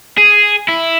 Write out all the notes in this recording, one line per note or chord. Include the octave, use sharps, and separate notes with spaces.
G#4
E4